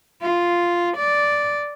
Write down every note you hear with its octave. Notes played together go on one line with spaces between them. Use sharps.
F4
D5